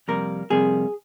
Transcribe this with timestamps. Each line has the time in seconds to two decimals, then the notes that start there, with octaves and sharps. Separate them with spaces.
0.08 F2 C3 G3 A#3 A#4
0.50 F2 C3 G3 A#3 G#4